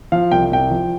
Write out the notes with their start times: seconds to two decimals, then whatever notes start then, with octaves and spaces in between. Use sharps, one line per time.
0.12 F3 F5
0.31 C2 G5
0.51 C2 G5
0.70 F3